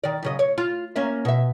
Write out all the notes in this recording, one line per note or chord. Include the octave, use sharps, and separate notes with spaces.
D#3 D5
F#2 C#3 D#5
C#5
F4
A#3 C#4 E5
B2 E5